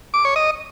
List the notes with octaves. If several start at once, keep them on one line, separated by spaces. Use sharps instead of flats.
D6
C#5
D#5